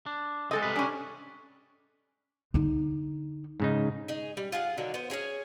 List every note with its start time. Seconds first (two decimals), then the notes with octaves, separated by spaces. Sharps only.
0.06 D4
0.51 G#3 C4 A4 D#5
0.62 C3 G3 B4
0.76 C#4 D4
2.54 D3 D#4
3.60 G#2 C#3 D#4
4.08 D#4 G#4
4.37 G3
4.52 F4 G#4 D#5 F#5
4.78 D3 D#3 F#3
4.94 B3 C5
5.10 C#4 D#4 G#4 C#5